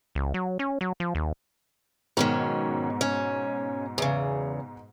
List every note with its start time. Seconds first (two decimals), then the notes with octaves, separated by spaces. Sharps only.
0.15 C#2
0.34 F#3
0.59 C#4
0.81 F#3
1.00 F3
1.15 D#2
2.17 G#2 B2 D#3 F#3 C#4
3.01 C#4
3.98 E2 C#3